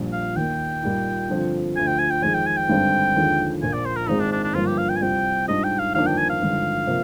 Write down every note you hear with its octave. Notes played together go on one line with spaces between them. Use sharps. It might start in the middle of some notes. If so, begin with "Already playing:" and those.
Already playing: A#1 A#2 G3
F5
D#2 D#3 A#3 D#4 G5
A#2 G3 A#3 D#4
G2 D3 F3 C4
D2 D3 F3 G#5
G5
G#5
G5
F2 D#3 G#3 G#5
G5
G#5
G5
G#1 G2 D3 G3 C4
D#2 D3 F3 G#3
A#1 A#2 F3 A#3 G#5
D5
C5
A#4
G#1 G#2 D#3 G#3 C4 D#4
D4
D4
D4
G1 G2 F3 A#3 F4
G4
F5
G5
G#5
C2 C3 G3 C4 F4 G5
G#2 G3 D4 F4 D#5
G5
F5
G1 F2 D#3 A#3 D4 F5
G5
G#5
F5
G#1 G2 D3 F3
C3 F3 A#3